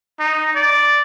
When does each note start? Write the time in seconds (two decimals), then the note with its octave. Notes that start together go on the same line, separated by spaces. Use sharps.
0.20 D#4
0.56 D5